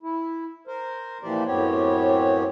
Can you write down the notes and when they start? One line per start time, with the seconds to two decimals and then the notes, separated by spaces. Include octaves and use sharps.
0.03 E4
0.67 A#4 C5
1.23 A#2 E3 F3 G4 C5 D5
1.46 F#2 A2 B3 C4 G4 C#5